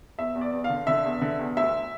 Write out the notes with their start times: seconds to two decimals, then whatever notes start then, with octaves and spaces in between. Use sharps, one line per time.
0.18 E2 E5
0.35 E2
0.41 D5
0.53 E2
0.64 F5
0.70 D3
0.87 D3 E5
1.04 E2
1.22 D3
1.39 E2
1.57 D2 E5